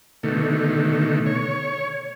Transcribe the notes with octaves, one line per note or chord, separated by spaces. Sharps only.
B2 D3 D#3 A3
C#5